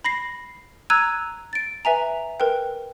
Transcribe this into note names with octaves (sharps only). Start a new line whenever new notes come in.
B5 A#6 C7
A#5 E6 F#6 G#6 D#7
A6 D7
B4 E5 G#5 A#5
A#4 B4 G5